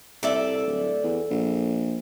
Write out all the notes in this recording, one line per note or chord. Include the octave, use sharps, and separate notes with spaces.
C2 A4 D5 E5
D1
E2
A#1